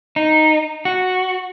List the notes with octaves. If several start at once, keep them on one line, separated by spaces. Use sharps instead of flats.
D#4
F#4